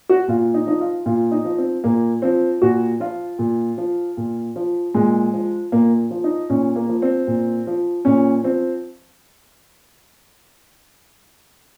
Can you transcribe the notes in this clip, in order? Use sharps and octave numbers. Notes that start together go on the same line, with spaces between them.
F#4
A#2 F4
D#4
F3 D#4
F4
A#2 F4
D#4
F3
C4
A#2 A#3
F3 C4
A#2 F#4
F3 F4
A#2
F3
A#2
F3
A#2 G#3
F3
A#2 A#3
F3
D#4
A#2 C#4
A#3
F3
C4
A#2
F3
A#2 C#4
F3 C4